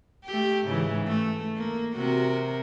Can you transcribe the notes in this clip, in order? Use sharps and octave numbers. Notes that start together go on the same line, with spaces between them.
A3 G4
G#2 C#3 E3
A3
A#3
C3 F#4 A#4